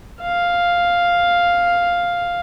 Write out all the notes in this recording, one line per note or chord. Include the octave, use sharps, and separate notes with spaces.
F5